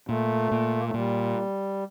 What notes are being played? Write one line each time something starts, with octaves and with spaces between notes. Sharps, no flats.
A#2 A3
A#2
A#3
A3
A#2 G3